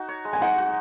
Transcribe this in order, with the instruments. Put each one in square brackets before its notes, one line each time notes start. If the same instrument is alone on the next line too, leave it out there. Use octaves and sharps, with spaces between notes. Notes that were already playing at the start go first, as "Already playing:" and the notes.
Already playing: [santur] D#4 F#4
C#5
G#3
[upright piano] G#5
[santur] D#4 [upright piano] F#5
[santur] F#4